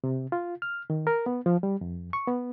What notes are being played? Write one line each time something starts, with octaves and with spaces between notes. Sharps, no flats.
C3
F4
F6
D#3
A#4
B3
F3
G3
F2
C#6
B3